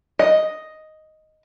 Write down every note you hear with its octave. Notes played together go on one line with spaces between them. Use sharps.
D#5